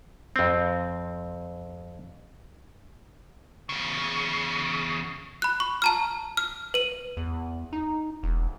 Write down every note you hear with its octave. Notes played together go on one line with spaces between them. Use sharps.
F2 C4
E2 C#3
B5 F#6
C#6
A5 A#5 F6
F6
B4 D#7
E2
D#4
E1